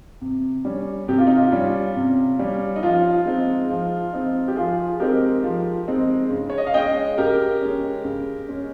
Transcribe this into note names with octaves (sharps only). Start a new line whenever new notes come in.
C3
G3 C#4
C3 G4
F4
D#4
F4
G3 C#4
C3
G3 C#4
D#4
F3 F4
G#3 C4 D#4
F3
G#3 C4 D#4
G4
F3 F4 G#4
G#3 C4 D#4 G4 A#4
F3
G#3 C4 D#4
C#3
C#5
D#5
F5
G#3 C#4 D#5 G5
C#3 G4 A#4
G#3 C#4
C#3
G#3 C#4